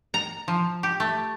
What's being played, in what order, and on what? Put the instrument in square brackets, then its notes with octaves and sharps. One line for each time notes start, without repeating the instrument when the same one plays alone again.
[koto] A#5
F3
G4
A3